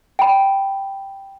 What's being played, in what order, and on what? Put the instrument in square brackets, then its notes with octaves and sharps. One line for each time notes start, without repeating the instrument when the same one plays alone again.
[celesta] G5 B5